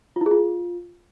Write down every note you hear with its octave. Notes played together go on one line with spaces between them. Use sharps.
F4
E4
G#4
F4